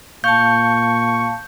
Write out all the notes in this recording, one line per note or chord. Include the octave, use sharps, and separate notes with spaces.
A#2 F5 A5 C#6 G6